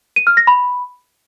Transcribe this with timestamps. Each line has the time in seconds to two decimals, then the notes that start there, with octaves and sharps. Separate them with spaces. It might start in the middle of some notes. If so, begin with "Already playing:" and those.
0.16 D#7
0.27 F6
0.37 A#6
0.47 B5